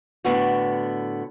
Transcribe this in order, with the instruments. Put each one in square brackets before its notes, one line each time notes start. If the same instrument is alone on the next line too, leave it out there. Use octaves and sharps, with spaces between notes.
[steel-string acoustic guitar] A2 D3 B3 F#4